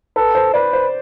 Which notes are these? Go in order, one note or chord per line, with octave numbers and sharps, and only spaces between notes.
A4 B4
C5
B4 D5
C5